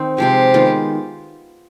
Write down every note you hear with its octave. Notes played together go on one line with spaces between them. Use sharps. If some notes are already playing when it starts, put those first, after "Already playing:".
Already playing: D#3 C4 D#4
C3 F3 G#3 G4
D#3 G#3 B3 F4